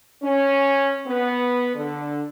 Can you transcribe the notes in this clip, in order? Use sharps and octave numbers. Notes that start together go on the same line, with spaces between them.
C#4
B3
D3